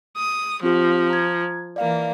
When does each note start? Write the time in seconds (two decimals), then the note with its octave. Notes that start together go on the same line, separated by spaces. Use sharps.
0.17 D#6
0.63 F3 C4 F4 G4
1.10 A#5 G#6
1.76 E3 A#3 D5 F5